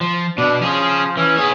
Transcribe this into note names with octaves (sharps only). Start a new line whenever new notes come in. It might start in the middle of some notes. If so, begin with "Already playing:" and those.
F3
B2 D4
F3 C#4 G#4
E3 C#4
B3 G#4 C#5